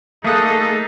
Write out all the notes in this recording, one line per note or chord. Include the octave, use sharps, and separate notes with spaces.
A3 A#3 D#4 G#4 A4 D#6 F#6